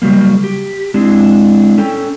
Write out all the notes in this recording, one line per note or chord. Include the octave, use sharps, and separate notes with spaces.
C#3 F#3 G3 A#3
G4
G#3 C4 D4 E4
C#4 A4 G5